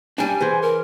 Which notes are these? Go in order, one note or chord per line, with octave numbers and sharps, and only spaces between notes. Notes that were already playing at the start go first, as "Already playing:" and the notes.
G3 D4 G#5
E3 G#4 C5
A#4